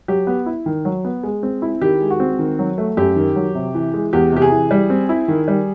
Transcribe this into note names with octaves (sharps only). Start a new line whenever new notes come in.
F#3 G4
B3
E4
D#3
F#3
B3
G#3
C4
E4
D#3 G4
G#3
F#4
C4
D#3
F#3
A3
F#2 G4
D#3
F#3
C3
E3
G#3
E2 G4
C3 G4
G#4
E3
G3
C4
E4
D#3
G3